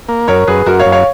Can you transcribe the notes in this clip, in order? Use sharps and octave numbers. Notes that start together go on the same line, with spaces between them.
A#3
F#2 A#4 C#5
F#2 G#4 B4
F#2 F#4 A#4
C#5 F5
F#2
C#5 F5